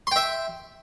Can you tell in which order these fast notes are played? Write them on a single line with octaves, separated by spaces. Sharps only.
C6 G5 E5